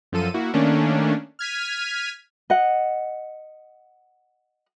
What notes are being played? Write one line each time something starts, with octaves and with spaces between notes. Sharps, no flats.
F#2 F3 A4 D#7
A#3 E4 F#4
D#3 A3 A#3 C#4 D4
F6 G#6 B6 D#7
D#5 F#5